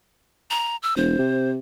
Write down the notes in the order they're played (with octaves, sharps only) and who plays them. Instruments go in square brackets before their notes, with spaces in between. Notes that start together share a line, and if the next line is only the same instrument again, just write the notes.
[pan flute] A#5
E6
[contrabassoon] E1 [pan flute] C5
[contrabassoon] C3